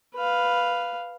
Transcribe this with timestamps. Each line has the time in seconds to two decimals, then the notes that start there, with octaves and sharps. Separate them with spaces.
0.15 B4 F5